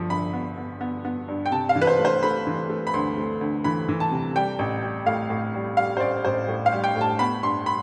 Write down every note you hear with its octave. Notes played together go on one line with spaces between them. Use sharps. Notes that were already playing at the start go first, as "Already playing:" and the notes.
Already playing: G1 G2 F3
G1 B5
B3
B3
B3
B3
G2
G5
C3 A5
F5
E3
B4
C5
A3
C5
A3 B5
E3
A3
B5
D2 C6
A3
D2
E3 B5
E3
A5
C3
G3 G5
A1
G3
A2 F5
A2
G3
G3 F5
C5
A1 D5
A1 C5
A2
F5
G3
G5
A2
A5
B3 B5
G2 C6
B5